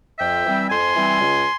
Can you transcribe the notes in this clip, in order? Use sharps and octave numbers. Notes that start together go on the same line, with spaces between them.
F2 E5 G5
E3 G3 C4
F2 G#5 C6
E3 G3 C4
C#2